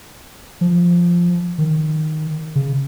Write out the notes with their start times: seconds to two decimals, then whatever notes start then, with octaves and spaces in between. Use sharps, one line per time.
0.61 F3
1.58 D#3
2.56 C#3